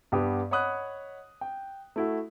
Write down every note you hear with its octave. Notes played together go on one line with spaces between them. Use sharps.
G2 B3 G4 F#5 D#6
C#5 D#5 F#5 B5 D#6 F#6
G5
A3 E4 F#4